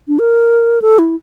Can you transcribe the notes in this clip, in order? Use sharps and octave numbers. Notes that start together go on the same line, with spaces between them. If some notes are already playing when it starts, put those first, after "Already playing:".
D4
A#4
A4
E4